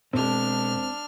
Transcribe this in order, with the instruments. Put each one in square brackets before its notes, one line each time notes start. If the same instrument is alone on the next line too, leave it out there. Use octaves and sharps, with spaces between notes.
[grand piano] E1 G#3 [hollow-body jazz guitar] C4 [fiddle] D4 F6